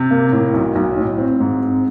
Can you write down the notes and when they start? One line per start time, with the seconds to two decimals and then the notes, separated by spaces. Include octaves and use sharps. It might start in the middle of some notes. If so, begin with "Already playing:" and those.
Already playing: C3
0.11 A#3
0.32 A2
0.54 B1
0.75 B1
0.98 A2
1.18 C4
1.40 G#2
1.62 C4